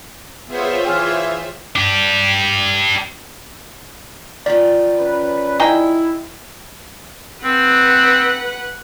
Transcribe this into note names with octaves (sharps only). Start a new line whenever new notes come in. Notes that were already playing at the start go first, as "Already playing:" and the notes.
B3 F4 G#4 C5 C#5 E5
E3 G5 G#5 F6
D4 G4
D#3 F3 D5
C#4 B4
D#4 E4 G#4 G5
C4 B4 F#5